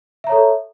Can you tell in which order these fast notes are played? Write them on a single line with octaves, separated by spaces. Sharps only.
E5 A#5 C#5 A4